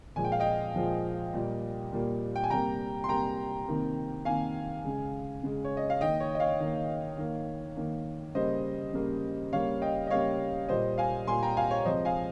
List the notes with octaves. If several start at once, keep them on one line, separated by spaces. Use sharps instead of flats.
A#2 F3 G#3 G#5
G5
F5
D#5 G5
A#2 F3 G#3
A#2 G3 A#3
A#2 G3 A#3
G5
G#5
C3 G3 A#3 G5 A#5
C6
C3 G3 A#3 G5 A#5
C3 D#3 A#3
C3 D#3 A#3 F5 G#5
C#3 G#3
C#3 G#3
C#5
D#5
F5
D#3 A#3 D#5 G5
C#5
D#5
C#5 F5
D#3 A#3
D#3 A#3
D#3 A#3
C#3 G3 A#3 C5 D#5
C#3 G3 A#3
C#3 G3 A#3 C#5 F5
D#5 G5
D#5
C#3 G3 A#3 C#5 F5
A#2 G3 A#3 C5 D#5
F5 G#5
A#2 G3 A#3 G#5 C6
G5 A#5
F5 G#5
C#5 F5
C3 F3 G#3 C5 D#5
F5 G#5